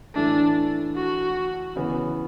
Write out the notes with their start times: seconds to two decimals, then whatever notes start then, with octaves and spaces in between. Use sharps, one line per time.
0.15 A2 E3 A3 D4
0.96 F#4
1.76 C#3 E3 B3